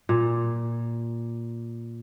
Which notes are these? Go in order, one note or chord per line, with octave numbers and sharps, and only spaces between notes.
A#2